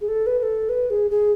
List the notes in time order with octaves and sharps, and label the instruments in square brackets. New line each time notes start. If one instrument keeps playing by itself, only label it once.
[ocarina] G#4
A4
B4
B4
A4
B4
G#4
G#4